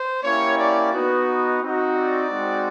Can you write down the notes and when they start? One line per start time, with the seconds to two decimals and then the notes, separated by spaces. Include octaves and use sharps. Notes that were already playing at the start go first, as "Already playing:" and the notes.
Already playing: C5
0.24 A#3 C#4 E4 G4 C#5
0.58 D5
0.93 B3 D#4 F#4
1.61 C4 D#4 F#4
1.95 D5
2.29 G#3 C4 D#4 F#4